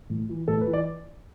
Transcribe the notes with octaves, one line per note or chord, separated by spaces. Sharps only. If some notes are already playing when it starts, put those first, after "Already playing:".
A2
E3
A2 A4
B4
E3
D5